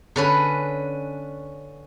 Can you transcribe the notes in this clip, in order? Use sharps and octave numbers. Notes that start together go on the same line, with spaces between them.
D3 C#4 B4